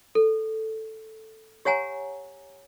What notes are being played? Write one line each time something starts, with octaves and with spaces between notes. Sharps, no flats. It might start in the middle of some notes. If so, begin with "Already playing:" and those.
A4
G4 C#5 F#5 G#5 A#5